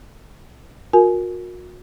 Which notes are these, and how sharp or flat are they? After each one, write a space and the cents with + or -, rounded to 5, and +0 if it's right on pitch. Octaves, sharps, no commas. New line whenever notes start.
F#4 -40 A#4 +0 G#5 +25